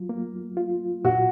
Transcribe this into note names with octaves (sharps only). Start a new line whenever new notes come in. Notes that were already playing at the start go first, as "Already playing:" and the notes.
Already playing: F#3 F4
A#3
F4
A#2 F#4